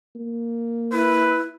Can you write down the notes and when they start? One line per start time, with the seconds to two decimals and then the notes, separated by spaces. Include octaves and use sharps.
0.16 A#3
0.92 E4 B4